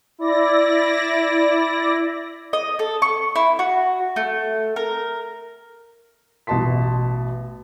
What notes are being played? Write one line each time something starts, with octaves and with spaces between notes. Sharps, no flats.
E4 D5 A#6
D#5
A4
C#6
E4
F#4
A3
A#4
A1 B2 D#5 A5 C6 B6